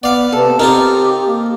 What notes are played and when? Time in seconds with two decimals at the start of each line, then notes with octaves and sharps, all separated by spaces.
0.03 B3 D5 F5
0.32 C3 B3 A4
0.59 C4 D#4 F4 G4 A4 A#4
1.27 A#3